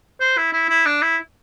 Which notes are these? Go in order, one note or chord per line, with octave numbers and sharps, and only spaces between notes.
C5
E4
E4
E4
D4
E4